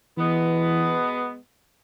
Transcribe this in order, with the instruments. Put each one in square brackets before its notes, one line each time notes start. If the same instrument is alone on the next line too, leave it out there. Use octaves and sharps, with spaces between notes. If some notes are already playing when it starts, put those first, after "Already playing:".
[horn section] B2 G#3 B3 [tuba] E3